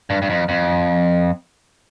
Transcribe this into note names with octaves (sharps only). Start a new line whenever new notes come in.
G2
G2
F2
F2